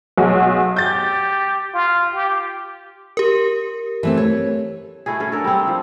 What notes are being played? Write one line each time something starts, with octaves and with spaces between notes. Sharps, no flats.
B1 F#4 G#4
G4 G6 A6
F4
G4
G4 A#4
E3 A3 C4
C#5
A3 E4 F#4 G#4
C#4 G#4 A4
D4 A4 A#4
G3 C4
F3